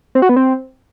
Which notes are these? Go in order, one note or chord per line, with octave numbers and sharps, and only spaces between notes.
C4
F#4
B3
C4